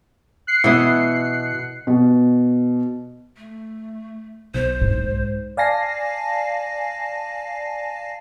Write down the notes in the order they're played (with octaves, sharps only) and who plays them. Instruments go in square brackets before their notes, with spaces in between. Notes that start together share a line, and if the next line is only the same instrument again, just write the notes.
[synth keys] F#6 C7 C#7
[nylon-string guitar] B2 D#5 [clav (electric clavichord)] E3 E4
[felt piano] B2
[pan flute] A3
[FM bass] B1 [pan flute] C5
[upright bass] G#2
[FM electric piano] D5 F5 G#5 A5 A#6 C7